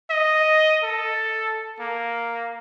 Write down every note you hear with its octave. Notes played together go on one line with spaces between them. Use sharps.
D#5
A4
A#3